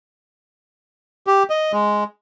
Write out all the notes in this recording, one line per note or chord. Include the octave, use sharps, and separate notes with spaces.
G4
D#5
G#3